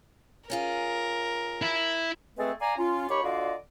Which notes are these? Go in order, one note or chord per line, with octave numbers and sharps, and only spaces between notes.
C#4 F4 G#4 A#4
E4
G#3 A3 C4 G#4 A4 B4
D5 F5 G#5 A#5
C#4 F4
D#2 G4 C#5 B5 C#6 D6
D3 F4 F#4 D5 D#5 F5